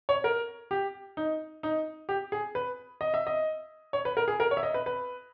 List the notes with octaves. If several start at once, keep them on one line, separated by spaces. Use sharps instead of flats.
C#5
A#4
G4
D#4
D#4
G4
G#4
B4
D#5
E5
D#5
C#5
B4
A#4
G#4
A#4
C#5
E5
D#5
B4
B4